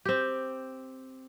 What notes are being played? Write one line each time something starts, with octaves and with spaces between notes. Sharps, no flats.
C4 G4